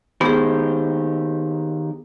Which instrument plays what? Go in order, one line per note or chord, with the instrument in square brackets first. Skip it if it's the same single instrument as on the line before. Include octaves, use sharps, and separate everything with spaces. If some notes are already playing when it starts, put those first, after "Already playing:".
[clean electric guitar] D#3 G4 C5 [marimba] B3 G#4